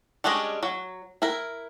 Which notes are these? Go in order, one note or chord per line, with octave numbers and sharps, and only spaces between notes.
G3 G#3 C#4 D4 D#5
F#3
E4 A#4